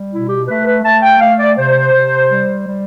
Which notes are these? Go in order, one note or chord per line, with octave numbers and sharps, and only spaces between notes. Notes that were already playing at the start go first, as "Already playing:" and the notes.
Already playing: G3
B2 E4
G4
A3 B4
B4
A3 A5
G5
A3 F5
D5
C3 C5
C3
G3
G3